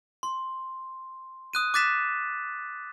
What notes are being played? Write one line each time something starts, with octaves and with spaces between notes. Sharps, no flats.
C6
D#6 F#6 D#7
D6 F#6 A6 B6 E7